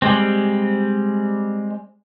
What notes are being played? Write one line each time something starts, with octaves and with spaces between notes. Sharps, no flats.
G3 G#3 C4